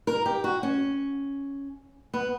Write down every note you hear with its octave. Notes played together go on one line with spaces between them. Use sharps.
A#4
G4
F#4
C#4
B3